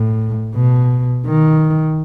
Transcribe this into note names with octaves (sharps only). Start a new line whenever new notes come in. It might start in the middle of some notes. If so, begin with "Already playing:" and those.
Already playing: A2
B2
D#3